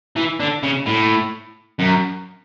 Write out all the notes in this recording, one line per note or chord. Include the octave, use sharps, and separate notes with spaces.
E3
D3
C#3
A2
F#2